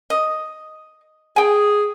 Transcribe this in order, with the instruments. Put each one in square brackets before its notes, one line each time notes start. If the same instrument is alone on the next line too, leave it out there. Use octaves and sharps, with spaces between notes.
[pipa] D#5
[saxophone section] G#4 [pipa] G5 G#5